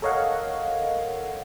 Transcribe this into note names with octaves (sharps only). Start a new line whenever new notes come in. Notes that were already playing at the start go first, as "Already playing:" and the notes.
A4 A#4 C#5 D#5 F5 F#5